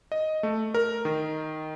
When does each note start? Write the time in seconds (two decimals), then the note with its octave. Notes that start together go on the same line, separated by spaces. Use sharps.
0.12 D#5
0.43 A3
0.74 A#4
1.05 D#3